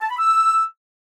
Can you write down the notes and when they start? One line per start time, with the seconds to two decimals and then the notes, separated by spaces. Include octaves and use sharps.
0.01 A5
0.10 B5
0.19 E6